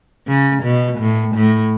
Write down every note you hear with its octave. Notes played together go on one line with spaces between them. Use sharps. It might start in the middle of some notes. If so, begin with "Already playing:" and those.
C#3
B2
A2
A2